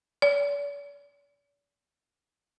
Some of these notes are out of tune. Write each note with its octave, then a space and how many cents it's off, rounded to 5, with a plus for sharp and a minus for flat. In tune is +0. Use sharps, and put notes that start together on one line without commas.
D5 -45